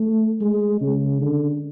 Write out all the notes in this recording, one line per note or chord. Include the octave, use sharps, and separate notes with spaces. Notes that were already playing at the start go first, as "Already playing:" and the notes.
Already playing: A3
G#3
C#3
D3